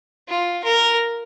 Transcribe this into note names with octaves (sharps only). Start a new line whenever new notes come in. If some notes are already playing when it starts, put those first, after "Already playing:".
F4
A#4